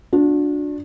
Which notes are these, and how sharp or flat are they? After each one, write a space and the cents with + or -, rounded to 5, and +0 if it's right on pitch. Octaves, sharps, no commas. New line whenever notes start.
D4 +0 F#4 -40